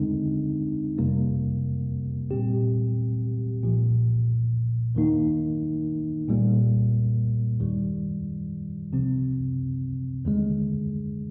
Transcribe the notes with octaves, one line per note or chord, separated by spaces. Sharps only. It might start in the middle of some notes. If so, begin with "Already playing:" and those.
Already playing: D#2 D3 G#3 C4 D#4
G1 F2 C3 G3 A#3
A#2 G3 C4 G4
C2 A#2 F3
D#2 D#3 A#3 D#4
C2 A#2 G3 A#3
D#2 D#3 G3
C2 C3 F3 C4
D#2 D3 G#3